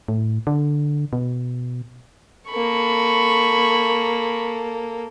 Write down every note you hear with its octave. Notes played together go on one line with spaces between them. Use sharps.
A2
D3
B2
A#3 A4 B5 C#6